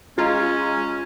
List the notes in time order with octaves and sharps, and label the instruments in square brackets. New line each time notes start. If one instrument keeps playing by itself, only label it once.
[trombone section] G#3 [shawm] C#4 [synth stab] F4 [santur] A#5